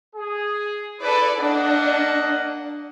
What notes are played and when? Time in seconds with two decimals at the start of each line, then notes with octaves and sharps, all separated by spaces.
0.16 G#4
1.01 E4 A4 B4 D5
1.40 A#3 D4 D#5 F#5